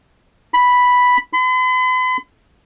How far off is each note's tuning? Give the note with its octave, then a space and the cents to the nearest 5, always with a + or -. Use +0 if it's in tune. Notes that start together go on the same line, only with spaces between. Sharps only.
B5 +0
B5 +45